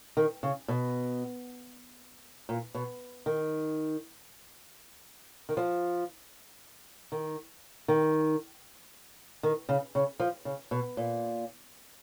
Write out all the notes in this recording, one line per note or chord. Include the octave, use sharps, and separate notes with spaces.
D#3
C#3
B2
A#2
B2
D#3
D#3
F3
D#3
D#3
D#3
C#3
C#3
F3
C#3
B2
A#2